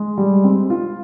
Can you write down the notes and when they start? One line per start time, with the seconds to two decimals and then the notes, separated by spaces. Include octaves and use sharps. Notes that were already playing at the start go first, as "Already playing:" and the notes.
Already playing: G#3
0.18 G3
0.44 C4
0.70 F4